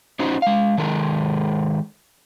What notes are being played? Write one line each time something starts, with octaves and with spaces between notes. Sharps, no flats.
C#4 D#4 F#4 C5
G#3 F5
D#3 G#3 A4 A#4